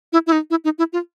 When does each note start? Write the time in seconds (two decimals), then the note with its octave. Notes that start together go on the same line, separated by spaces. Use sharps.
0.13 E4
0.27 E4
0.32 D#4
0.50 E4
0.64 D#4
0.79 E4
0.93 F4